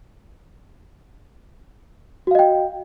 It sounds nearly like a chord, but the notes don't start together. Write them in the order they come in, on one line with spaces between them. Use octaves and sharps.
F#4 F5 D#5 G5